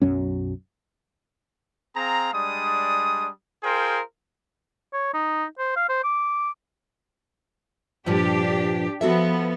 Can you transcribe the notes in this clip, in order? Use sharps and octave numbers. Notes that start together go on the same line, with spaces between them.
B1 F#2 F#3 C#4
C4 G#4 F5 A#5
G3 G#3 D4 D#6
F4 G#4 A#4 C5 G5
C#5
D#4
C5
F5
C5
D6
G2 A#2 F3 D4 G4
F3 B3 F#4 A4 E5